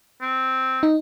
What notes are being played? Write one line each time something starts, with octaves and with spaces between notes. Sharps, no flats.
C4
D#4